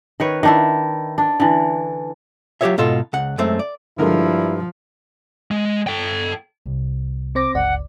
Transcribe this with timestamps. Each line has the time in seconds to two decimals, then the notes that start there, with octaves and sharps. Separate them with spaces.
0.20 D#3 B4 C#5
0.43 D#3 D4 E4
1.18 D4
1.40 D3 E3
2.61 F#3 F4 G4 A4 C#5 E5
2.78 G#2 B2 F4 A4
3.13 C#2 F#5
3.38 F#2 G#3 A3 C4
3.59 D5
3.98 G2 D3 F3 G#3 E4 A#4
5.51 G#3
5.87 A4 G5
6.66 C2
7.35 C4 C5 D6 A#6
7.54 G1 C#2 D5 F#5